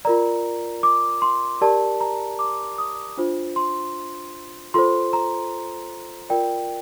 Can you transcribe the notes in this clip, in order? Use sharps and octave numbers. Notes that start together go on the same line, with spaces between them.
F4 A#4 D5 A#5
D6
C6
G4 A#4 D5 A5
A#5
D6
D#6
D4 F4 C5
C6
F4 A4 C5 C6
A#5
F4 A#4 D5 G5